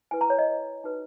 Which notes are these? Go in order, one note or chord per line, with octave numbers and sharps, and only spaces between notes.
E4 B4 G#5
A#5
C#5
D#5
D#4 F#4 B4